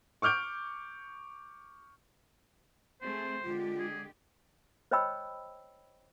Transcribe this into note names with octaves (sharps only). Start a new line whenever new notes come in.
C#6 D6 F6 G6 D7
A3 C4 G#4 C5
D3 G#3 F4 G4
G#4
C5 C#5 D#5 G5 B5 E6